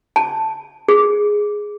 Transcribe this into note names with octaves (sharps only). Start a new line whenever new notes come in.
A5
G#4